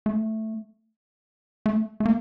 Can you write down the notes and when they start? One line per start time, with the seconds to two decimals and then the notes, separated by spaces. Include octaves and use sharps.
0.06 A3
1.66 A3
2.00 A3
2.06 A#3